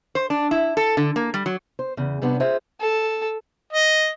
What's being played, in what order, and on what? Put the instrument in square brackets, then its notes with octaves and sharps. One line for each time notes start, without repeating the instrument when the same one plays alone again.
[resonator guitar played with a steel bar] C5
D4
E4
A4
D3
A#3
G3
F#3
[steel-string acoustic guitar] C5
E2 C#3
C3 G3 B3 D4
F4 G#4 C5 E5
[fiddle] A4
[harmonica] D#5